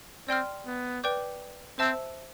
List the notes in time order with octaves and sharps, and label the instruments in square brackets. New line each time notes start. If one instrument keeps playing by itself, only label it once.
[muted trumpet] C4 [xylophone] D5 G5 C6 F6
[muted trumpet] B3
[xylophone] B4 D5 G5 D6 G6
[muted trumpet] C4 [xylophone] C5 E5 A5 E6